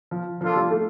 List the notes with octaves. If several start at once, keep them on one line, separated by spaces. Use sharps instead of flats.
F3
F3 A#3 D4 F4 A4
G3
A3